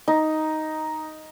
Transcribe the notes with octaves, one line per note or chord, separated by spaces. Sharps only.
D#4